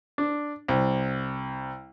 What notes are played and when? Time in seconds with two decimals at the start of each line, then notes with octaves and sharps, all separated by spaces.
0.18 D4
0.68 C2